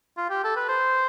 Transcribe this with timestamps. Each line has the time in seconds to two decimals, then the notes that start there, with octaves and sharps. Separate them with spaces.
0.17 F4
0.30 G4
0.44 A4
0.56 B4
0.69 C5